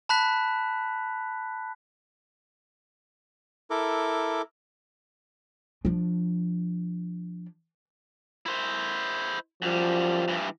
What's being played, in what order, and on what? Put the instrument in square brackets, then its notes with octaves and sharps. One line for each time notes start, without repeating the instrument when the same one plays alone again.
[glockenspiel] A5 B5 F#6 B6
[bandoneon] E4 A4 A#4 D6
[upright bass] F3 D4
[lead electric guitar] E4 C5
[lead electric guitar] F#2 G3 [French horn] F3
[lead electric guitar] G2 E3